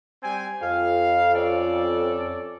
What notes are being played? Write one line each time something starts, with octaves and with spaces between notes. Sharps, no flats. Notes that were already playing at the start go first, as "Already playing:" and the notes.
G3 C4 G#5
F2 F5
C#4 A4 D5